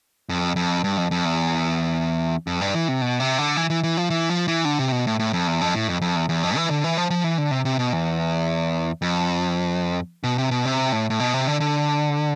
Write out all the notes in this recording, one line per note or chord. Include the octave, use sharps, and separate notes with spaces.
F2
F2
G2
F2
F2
E2
F2
G2
E3
C3
B2
C3
D3
E3
E3
E3
F3
E3
F3
E3
D3
C3
B2
A2
A2
F2
E2
F2
A2
F2
F2
E2
E2
F2
E3
D3
E3
F3
F3
E3
D3
C3
C3
B2
E2
F2
B2
C3
B2
C3
A2
A2
B2
C3
D3
D3